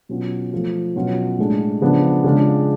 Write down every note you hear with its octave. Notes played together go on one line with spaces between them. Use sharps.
B2 F#3 C#4 F4
F3 A3 F4
B2 F#3 C#4 F4
A2 G#3 D4
C#3 F3 B3 D4
C#3 G#3 D4 F4